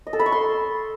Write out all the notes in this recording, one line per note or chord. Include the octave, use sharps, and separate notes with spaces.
D#5
A4
B5
C#6
C6